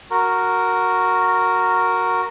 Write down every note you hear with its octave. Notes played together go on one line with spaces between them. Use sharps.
F#4 A#4